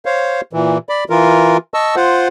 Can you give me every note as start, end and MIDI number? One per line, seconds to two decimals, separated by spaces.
0.05 0.41 72
0.05 0.41 73
0.05 0.41 77
0.53 0.78 46
0.53 0.78 52
0.89 1.04 74
0.89 1.04 83
1.10 1.57 52
1.10 1.57 65
1.10 1.57 70
1.74 1.95 75
1.74 1.95 81
1.74 1.95 85
1.74 1.95 88
1.96 2.28 65
1.96 2.28 72
1.96 2.28 78